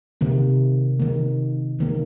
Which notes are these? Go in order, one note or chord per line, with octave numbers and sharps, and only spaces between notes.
C3 D#3 A#3
C3 D#3 A#3
C3 D#3 A#3